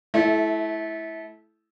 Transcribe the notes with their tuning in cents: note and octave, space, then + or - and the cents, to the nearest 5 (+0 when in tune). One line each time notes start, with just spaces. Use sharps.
A3 -25 E4 +0